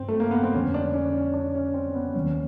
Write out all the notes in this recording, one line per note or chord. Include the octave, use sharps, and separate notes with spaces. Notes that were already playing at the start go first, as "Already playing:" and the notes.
Already playing: G2 C4
A3
A#3
B3
C4
F2 D3 F3 C#4
D4
C#4
C#4
D4
C#4
C4
B3
D#2 D#3 F#3 A#3 C#4